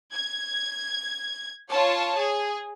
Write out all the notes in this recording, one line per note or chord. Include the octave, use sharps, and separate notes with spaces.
G#6
F4 C#5 A5
G#4